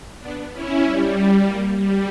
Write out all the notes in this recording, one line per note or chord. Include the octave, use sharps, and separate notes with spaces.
B3 D4
C#4 E4
G3
A#3
G3